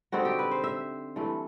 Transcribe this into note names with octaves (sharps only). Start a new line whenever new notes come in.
D3 G3 C4 D#4 F#4
G4
B4
C5
E5
G2 E3 A3